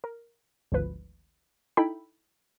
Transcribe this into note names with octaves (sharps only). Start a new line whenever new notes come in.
A#4
G#1 D2 F3 B4
D#4 E4 A4 G5 B5